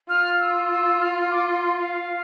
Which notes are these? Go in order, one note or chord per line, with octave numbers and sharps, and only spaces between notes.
F4 F6
E6
E6
F6
D6
C6
C6
F5